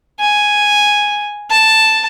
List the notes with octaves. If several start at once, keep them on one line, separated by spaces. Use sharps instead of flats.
G#5
A5